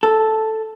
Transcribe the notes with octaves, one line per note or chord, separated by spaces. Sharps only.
A4